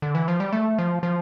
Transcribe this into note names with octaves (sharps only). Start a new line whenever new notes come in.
D3
E3
F3
G3
A3
F3
F3